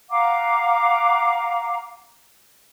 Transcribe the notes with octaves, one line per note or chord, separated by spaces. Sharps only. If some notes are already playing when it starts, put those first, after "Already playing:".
F5 F#5 A#5 D6